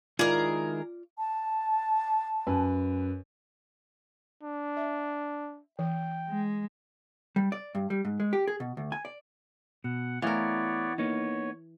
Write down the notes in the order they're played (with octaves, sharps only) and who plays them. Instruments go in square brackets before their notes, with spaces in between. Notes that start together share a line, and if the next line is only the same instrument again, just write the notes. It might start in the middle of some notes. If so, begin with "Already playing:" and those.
[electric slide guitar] D#3 G#3 E4 [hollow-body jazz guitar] F4 D5 [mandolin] G#4 A#4
[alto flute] A5
[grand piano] F#2 B4 G#5
[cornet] D4
[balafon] E5
[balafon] E3 [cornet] G5
[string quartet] G#3
[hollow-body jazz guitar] G3
D5
G2
G3
G#2
G#3
G4
G#4
B2
D2
G#5
D5
[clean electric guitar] B2 [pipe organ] F#5
[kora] E3 A#4 [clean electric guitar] A3 F5 [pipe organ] B3 C#5 D5
[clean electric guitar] A#3 B3 D#4 [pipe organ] C#5